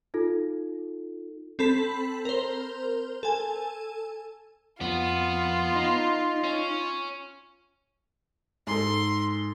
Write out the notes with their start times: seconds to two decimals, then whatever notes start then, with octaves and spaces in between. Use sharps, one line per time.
0.14 D#4 F4 A4
1.59 C4 A4 B5 B6
2.25 A#4 C5
3.23 A4 G#5
4.81 F2 B3 F4
5.75 D#4
6.44 C#4
8.67 G#2 A4 C6